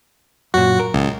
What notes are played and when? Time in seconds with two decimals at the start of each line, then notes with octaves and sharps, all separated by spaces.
0.54 F#2 A#2 F#4
0.79 A#4
0.94 C#2